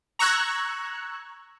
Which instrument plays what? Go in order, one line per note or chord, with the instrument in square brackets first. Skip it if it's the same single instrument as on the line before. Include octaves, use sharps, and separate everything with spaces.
[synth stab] A#5 C#6 E6 F#6 G#6